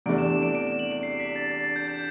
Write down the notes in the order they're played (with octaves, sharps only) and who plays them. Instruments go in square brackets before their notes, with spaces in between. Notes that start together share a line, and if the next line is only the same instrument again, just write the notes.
[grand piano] E2 C3 E3 A3 D4 [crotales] D7
[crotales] E7
E7
D7
D7
E7
F#7
D7
C7
B6
A6
A6
A6
G6
G6